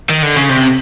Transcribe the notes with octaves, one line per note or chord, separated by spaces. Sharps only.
D#3
D3
C#3
C3